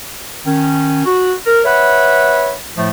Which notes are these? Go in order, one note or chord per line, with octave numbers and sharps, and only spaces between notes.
D#3 C#4
F#4
A#4
B4 C#5 E5 F#5 B5
A2 F3 A3